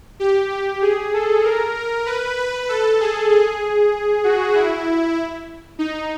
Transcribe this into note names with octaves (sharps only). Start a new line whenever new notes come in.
G4
G4
G#4
A4
A#4
A#4
B4
B4
A4
G#4
G#4
F#4
E4
D#4